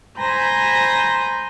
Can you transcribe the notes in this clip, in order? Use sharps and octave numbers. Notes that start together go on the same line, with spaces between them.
C5 G#5 A#5 B5 G6 A#6